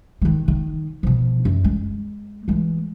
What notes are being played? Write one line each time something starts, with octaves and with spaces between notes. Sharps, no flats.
D#3 G#3
D#3
B2 F3
F#2
G#3
E3 G#3